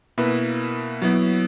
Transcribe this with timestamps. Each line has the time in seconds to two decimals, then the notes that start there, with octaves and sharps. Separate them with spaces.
0.18 B2 A#3 E4 B4
1.02 F#3 B3 E4